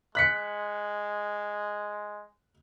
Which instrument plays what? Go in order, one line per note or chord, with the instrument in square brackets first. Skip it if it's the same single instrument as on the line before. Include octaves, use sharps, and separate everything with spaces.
[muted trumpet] G#3 [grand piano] F#6 B6 C#7